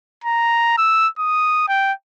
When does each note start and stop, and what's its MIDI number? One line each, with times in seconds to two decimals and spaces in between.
0.24 0.74 82
0.78 1.08 88
1.19 1.64 87
1.68 1.93 79